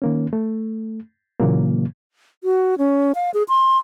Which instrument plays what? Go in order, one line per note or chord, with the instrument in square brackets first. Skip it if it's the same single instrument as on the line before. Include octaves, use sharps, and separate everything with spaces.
[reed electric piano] D#3 A#3 C#4
A3
A#2 C#3 E3 F#3 A#3
[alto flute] F#4
C#4
F5
G#4
C6